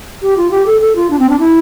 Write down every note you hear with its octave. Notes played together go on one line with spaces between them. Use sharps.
G4
F4
G4
A4
A4
F4
D4
C4
D4
E4